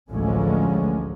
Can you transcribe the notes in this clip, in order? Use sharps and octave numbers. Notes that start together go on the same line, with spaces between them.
A1 D2 D3 F3 G#3 C#4